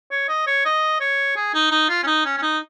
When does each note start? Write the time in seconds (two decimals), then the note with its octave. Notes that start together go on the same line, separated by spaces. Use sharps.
0.11 C#5
0.29 D#5
0.47 C#5
0.65 D#5
1.01 C#5
1.36 G#4
1.54 D#4
1.71 D#4
1.89 F4
2.03 C#4
2.07 D#4
2.25 C#4
2.37 C#4
2.42 D#4